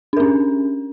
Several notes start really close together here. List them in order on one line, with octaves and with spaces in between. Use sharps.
D4 A#4 C#4